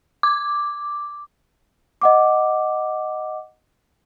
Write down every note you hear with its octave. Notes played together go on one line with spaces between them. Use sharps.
D6
D#5 F#5 D6